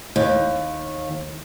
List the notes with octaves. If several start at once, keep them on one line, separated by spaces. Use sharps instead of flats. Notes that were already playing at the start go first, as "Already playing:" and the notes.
D#2